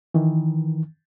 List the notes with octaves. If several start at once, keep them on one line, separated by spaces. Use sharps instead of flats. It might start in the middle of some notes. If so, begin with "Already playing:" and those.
D#3 E3